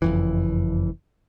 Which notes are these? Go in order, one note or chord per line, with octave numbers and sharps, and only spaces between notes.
F#1 F2 E3